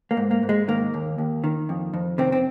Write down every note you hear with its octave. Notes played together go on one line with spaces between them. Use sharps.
A#3
G#2
A#3
G#2
G#3
D#3 A#3
D#2
D#2
D#3
F2
F2
C3 D#3 C4
C4